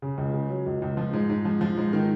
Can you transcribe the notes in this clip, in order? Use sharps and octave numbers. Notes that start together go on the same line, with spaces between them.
C#3
C#2
C#3
F#3
C#2
C#2
F3
G#2
G#2
F3
F3
G#2
D#3